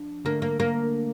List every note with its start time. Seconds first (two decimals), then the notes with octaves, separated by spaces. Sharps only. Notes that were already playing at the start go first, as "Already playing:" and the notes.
Already playing: F3 D4
0.25 D3 A3 A#3 D4
0.42 A#3
0.60 A#3